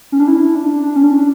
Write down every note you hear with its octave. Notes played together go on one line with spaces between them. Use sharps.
C#4
D4
E4
D4
D4
C#4
D4
D4